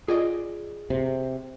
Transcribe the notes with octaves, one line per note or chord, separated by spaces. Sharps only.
F4 G#4 D5 D#5
C3